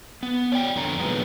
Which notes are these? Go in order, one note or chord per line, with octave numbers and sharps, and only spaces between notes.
B3
C#5 D5 G5
F2 D3 A#5
A#2 D3 D#3 F#3 G#3 B3